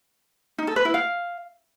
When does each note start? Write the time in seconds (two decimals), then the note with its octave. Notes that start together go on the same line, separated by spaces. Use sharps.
0.58 D#4
0.67 A4
0.76 B4
0.85 E4
0.94 F5